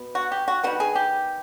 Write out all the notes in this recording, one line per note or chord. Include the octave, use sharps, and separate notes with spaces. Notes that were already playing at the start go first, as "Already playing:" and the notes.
Already playing: B2 B3
F#4
G4
F#4
D#3 G3 B3 F#4
G#4
G4